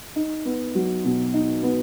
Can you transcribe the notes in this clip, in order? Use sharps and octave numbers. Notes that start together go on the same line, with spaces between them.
D#4
B3
F#3
B2
D#4
B3